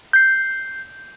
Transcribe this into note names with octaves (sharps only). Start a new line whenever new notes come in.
G6 C7